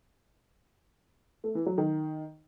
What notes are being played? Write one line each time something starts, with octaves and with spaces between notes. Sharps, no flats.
A3
E3
F#3
D#3